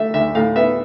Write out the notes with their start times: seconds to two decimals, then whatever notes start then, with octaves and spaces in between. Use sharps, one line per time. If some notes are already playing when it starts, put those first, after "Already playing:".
Already playing: D3 A3 E5
0.14 D2 E5
0.35 A2 F5
0.56 B3 E5